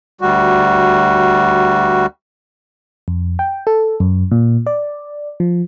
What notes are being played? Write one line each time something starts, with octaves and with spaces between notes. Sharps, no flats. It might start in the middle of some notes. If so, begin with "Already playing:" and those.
D2 G3 F#4
F2
G5
A4
F#2
A#2
D5
F3